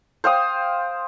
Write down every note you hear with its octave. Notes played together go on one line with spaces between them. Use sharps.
C5 F5 G5 D#6